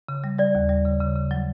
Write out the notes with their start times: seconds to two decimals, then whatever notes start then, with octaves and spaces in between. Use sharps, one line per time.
0.09 C#3
0.24 G3
0.38 G3 D5
0.55 D#2
0.69 G3
0.85 C#3
1.00 C#3
1.16 C#3
1.31 F#3